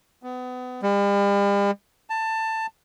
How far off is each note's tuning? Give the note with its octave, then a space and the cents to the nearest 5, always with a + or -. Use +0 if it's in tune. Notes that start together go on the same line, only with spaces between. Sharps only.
B3 +30
G3 +45
A5 +15